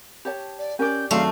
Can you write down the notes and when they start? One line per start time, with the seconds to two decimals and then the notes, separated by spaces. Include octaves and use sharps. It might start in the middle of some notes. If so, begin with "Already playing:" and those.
0.25 G4 C#5 A5
0.58 D5
0.79 C#4 G4 A#4 D5 G#5 G6
1.11 F#2 D#3 A3 C4 D4 G#4 D5 F5